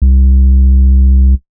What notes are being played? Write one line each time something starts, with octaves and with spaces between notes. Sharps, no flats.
C2